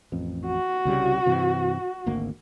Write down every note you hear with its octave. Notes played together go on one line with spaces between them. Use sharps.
A1 F2
F#4
C2 C#3 G3
G2 C3 E3
G#1 D2 A#3